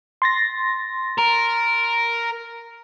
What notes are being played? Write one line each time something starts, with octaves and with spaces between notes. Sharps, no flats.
C6 A6 A#6
A#4